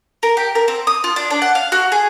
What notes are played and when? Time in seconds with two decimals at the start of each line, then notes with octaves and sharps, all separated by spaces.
0.23 A#4
0.37 G4
0.55 A#4
0.68 C4
0.87 D#6
1.04 F4
1.16 D4
1.30 D4
1.42 F#5
1.55 F5
1.72 F#4
1.92 G#4